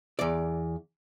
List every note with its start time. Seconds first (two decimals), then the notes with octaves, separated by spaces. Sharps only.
0.19 E2 D5